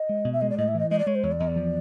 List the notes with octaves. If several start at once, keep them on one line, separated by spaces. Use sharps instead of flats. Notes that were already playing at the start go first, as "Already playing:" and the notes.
Already playing: D#5
G#3
B2
E5
G#3 D#5
D5
A2 D#5
E5
E3 D#5
G#3 D#5
D5
G#3 C#5
C5
E2 C#5
D5
E2 D#5
D5
F3